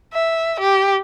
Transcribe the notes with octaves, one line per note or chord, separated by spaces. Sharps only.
E5
G4